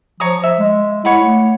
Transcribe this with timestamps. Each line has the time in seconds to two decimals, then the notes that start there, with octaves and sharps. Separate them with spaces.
0.20 F3 C#5 A#5 D#6
0.43 E5
0.59 G#3
1.05 E4 C#5 F#5 B5
1.23 A3